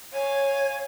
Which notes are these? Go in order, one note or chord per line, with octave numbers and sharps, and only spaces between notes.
C#5 F5 G#5